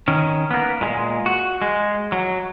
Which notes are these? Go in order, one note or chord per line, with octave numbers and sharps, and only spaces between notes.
D#3 C#4
A#3 B3
A#2 G#3
F#4
G#3
F#3